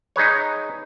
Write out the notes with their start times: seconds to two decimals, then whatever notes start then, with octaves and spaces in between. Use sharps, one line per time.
0.16 D#4 G#4 B4 C#5